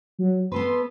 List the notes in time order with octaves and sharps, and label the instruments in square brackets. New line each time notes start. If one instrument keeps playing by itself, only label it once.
[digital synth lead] F#3
[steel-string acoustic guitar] B3 A4 B4 [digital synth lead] C6